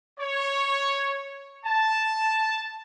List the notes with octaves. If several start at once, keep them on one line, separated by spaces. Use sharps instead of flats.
C#5
A5